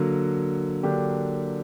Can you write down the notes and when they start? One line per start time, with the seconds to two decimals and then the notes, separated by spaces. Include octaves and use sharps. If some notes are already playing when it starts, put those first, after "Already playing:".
Already playing: D3 F#3 A#3
0.83 D3 F#3 A#3 D4 G4